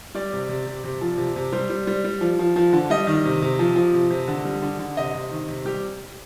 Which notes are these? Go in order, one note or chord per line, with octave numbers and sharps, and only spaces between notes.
G3 D5
C3
C3
C3
C3
F3
C3
C3
G3 C5
G3
G3
G3
F3
F3
F3
D3
G3 D#5
D#3
C3
C3
F3
F3
C3
C3
D3
G3
D3
D3
C3 D#5
C3
D#3
C3
G3 G4